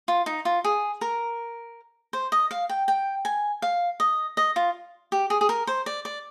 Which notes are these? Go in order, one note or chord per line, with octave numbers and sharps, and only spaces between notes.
F4
D#4
F4
G#4
A#4
C5
D#5
F5
G5
G5
G#5
F5
D#5
D#5
F4
G4
G#4
G#4
A#4
C5
D5
D5